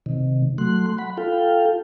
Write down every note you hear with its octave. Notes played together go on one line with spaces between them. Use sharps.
C3 D#3
F#3 A3 C6 F#6
F#5 B5
F4 A4 F5 G5